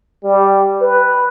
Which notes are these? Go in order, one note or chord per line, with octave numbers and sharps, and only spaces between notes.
G3
B4